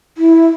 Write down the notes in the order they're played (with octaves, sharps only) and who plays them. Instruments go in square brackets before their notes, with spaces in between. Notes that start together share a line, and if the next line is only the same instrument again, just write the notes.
[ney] E4